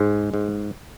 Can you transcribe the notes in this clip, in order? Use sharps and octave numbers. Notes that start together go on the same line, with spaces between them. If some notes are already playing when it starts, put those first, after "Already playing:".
Already playing: G#2 G#3
G#2